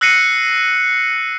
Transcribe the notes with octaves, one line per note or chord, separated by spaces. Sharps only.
E6 F#6 A#6 C7 C#7 D#7